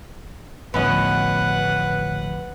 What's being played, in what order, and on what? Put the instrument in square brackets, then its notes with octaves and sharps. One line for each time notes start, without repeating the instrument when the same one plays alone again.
[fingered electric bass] A1 D2 F3 [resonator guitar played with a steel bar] B3 C#4 D#5 [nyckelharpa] B4 F#5